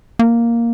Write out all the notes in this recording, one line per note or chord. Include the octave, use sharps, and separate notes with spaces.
A#3